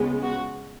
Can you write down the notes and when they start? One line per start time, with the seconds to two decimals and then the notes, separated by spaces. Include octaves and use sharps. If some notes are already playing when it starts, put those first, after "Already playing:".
Already playing: C#2 C#3 G#3 B3
0.22 F#4